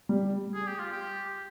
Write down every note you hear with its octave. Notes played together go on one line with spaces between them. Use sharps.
G3
G#4
G4
F4
G4